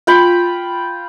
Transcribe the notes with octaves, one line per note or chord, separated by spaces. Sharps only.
F4 G5 B5